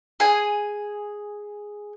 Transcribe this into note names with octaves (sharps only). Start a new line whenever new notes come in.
G#4 G#5